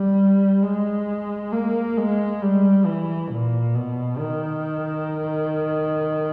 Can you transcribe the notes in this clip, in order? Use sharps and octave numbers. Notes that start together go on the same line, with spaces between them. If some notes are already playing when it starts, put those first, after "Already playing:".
Already playing: G3
G#3
A#3
G#3
G3
E3
A#2
B2
D#3